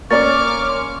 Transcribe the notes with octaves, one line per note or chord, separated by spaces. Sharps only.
A#3 C#4 A#4 D5 C#6 D6 F6 A6
C6